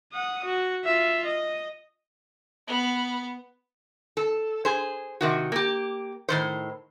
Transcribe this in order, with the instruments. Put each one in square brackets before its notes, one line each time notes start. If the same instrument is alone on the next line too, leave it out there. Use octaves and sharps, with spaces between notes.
[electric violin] F#5 D#6
F#4
F4 E5
D#5
[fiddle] B3
[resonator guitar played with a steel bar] A4
G#4 C5
C3 D#3 F#4
A#3 G4
A2 D#3 C5